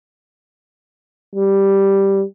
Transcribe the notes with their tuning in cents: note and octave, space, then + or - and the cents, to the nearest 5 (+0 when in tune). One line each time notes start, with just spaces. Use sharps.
G3 +0